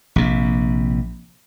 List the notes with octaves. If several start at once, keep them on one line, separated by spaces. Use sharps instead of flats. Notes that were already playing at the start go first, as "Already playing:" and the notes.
A#1 C3